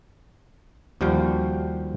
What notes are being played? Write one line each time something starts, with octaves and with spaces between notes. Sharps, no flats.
D#2 F3 G3 F#4 F5 G5